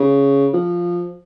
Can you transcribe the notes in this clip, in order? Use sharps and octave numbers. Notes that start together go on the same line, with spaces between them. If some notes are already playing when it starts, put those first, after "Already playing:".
Already playing: C#3
F3